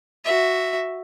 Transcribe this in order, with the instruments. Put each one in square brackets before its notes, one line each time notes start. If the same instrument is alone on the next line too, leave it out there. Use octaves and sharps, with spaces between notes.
[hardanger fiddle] F#4 E5